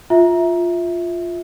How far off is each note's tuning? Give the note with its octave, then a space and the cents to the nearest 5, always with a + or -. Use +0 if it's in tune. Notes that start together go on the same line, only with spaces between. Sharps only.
F4 +0 E5 -10